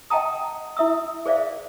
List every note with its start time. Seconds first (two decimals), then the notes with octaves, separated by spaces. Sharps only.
0.10 D#5 F#5 G5 A5 A#5 D#6
0.77 E4 E5 D#6 E6
1.26 G#4 C5 D5 E5 F5